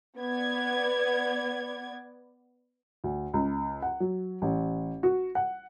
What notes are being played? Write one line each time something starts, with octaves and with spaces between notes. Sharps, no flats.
B3 D5 G#6
D2
C#2
F#5
F#3
A1
F#4
F#5